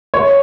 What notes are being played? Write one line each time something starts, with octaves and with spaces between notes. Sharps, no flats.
C#5